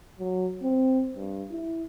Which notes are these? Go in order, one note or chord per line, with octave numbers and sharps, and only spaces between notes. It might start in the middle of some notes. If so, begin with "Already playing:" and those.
F#3
C4
G2
E4